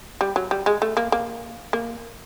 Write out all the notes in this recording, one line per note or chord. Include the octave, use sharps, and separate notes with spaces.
G3
F#3
G3
G#3
A3
A#3
A#3
A#3